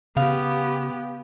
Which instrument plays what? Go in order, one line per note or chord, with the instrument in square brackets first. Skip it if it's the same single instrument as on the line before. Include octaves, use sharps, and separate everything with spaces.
[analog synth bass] C#3 [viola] B3 G4 [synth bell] F5